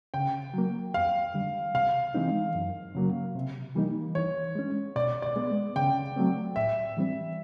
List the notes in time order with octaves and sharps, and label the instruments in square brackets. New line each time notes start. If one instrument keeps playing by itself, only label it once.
[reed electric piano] C#3 [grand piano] G5
[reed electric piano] F#3 A#3
[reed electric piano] F2 [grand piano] F5
[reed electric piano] D3 G3
[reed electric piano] C3 [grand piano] F5
[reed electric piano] E3 G#3 C4 D#4
F#2
C#3 F#3 A#3
C3
E3 G3 A#3 D#4
[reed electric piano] E3 [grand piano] C#5
[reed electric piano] G#3 C#4
[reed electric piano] B2 [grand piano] D5
[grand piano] D5
[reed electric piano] G#3 B3
[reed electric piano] C#3 [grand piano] G5
[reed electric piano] F#3 A3 C4
[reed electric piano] A2 [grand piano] E5
[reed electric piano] E3 G3 C4